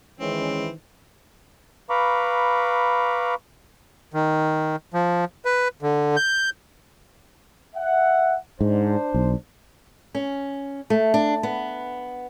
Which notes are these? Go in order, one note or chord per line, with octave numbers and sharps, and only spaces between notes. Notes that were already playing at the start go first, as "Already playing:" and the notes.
D#3 E3 G#3 C4 C#4
B4 F5 A#5 B5 C#6 D6
D#3
F3
B4
D3
G6
E5 F#5
G#2 D4 C5
B1
C#4
A3
D4
B3